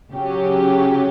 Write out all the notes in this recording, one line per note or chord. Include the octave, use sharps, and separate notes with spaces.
C#3 F#3 C#4 G4